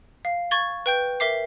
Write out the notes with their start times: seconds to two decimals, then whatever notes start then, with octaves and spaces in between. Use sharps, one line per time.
0.25 F5
0.51 C#6 G#6 A6 G7
0.86 B4 G5 G6
1.20 A#4 E5 D6 C7